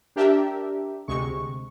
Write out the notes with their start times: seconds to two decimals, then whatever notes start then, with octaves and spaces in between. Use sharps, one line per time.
0.16 D4 G4 A#4 E5
1.08 D2 C3 G#3 C#6